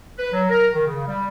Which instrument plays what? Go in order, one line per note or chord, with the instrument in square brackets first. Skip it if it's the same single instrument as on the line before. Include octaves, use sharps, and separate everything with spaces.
[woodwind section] B4
F#3
A#4
D#3
C#3
G3